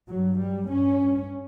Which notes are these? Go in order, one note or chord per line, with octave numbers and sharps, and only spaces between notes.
G2 F#3
G3
G2 C#4